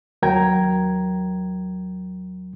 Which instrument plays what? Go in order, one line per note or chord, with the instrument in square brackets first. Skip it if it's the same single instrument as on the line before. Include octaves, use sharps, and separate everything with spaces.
[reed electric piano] D#2 F#3 A#4 G5 A#5 G#6